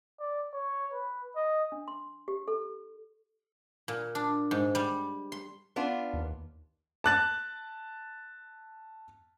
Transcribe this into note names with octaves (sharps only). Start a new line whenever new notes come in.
D5
C#5
B4
D#5
D4
C6
G4
A4
A#2
D4
G#2
G3
C6
B3 D4 F4
D#2
A5 F#6 A6